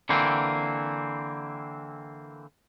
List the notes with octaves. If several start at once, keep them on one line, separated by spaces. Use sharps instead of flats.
D3 E3 A#3 C4